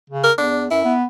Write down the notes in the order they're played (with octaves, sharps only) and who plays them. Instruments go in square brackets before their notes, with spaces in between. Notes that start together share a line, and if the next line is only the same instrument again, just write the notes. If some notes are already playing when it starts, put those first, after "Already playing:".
[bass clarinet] C#3
[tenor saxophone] A#4
[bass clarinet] E2 [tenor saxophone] D4
[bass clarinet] F#2 [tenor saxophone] E4
[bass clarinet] B3